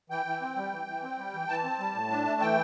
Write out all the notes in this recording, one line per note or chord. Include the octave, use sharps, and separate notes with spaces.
E3 G5
E3
C4
G3
E3
E3
C4
G3
E3
E3 A5
C4
G3
A2
D4
A3
E3 G5